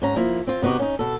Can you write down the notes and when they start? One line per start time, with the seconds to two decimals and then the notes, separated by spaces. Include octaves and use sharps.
0.02 G#2 C#4 A#5
0.16 F3 A#3 E4
0.47 C4 F4
0.62 C3 B3 D#4 F#4 G4
0.79 C#4 D#4
0.99 B2 A4